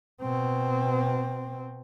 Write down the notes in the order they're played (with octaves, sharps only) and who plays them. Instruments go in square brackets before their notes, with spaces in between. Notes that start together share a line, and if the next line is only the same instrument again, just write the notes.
[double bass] B2 C4